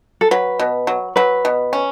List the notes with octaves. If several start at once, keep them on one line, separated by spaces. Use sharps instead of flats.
A4
F#3 B4
B2
F#3
F#3 B4
B2
C#4